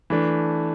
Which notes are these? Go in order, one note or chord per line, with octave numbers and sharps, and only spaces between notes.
E3 A3 D4